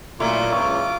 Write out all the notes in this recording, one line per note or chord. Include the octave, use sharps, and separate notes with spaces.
A#2 F#3 A3 E4 F4 D6
C#2 C#6